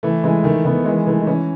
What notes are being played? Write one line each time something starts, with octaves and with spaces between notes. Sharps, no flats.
E3 A3
E3 G#3
D#3 A3
D#3 B3
E3 G#3
E3 A3
D#4
E3 C#4